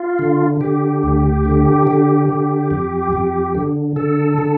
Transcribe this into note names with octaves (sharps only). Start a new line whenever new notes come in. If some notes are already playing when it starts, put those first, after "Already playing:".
Already playing: F4
D3
D3 G4
D2
D3
D3
D3
F2
F2
D3
D3 A4
D3